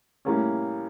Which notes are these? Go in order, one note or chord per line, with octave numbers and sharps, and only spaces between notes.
A2 G3 A#3 C#4